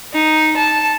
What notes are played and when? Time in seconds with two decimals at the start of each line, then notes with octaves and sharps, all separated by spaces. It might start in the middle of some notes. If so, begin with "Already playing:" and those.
0.13 D#4
0.57 A5